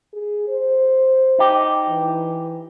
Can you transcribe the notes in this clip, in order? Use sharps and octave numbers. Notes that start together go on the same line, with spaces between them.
G#4
C5
D#4 G4
E3